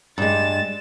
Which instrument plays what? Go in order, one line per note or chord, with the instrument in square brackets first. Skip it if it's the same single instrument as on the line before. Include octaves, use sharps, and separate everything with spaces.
[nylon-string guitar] G2 G#3 [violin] A6 E7